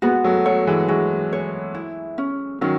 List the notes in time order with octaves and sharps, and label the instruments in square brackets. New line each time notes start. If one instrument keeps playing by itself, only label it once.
[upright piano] G#3 B3 [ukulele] F#4
[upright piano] F#3 A3
[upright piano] F#3 A3 [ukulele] C#5
[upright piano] E3 G#3
[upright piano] E3 G#3 [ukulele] F#4
[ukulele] C#5
E4
C#4
[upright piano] D#3 F#3 [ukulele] C#4